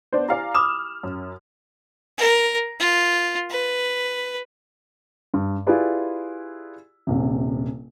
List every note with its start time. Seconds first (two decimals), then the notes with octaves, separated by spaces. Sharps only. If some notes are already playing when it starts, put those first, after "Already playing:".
0.13 B3 D4 C5
0.28 E4 G4 D5 F5 G#5 A#5
0.54 B5 D6 D#6 F6 E7
1.03 F#2
2.18 A#4
2.80 F4
3.50 B4
5.34 G2
5.67 E4 F4 G4 G#4 B4 D5
7.07 D#1 A#1 C3